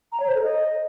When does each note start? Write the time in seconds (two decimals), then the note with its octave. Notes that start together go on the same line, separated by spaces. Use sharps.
0.12 A#5
0.20 C#5
0.28 C5
0.35 A4
0.43 D#5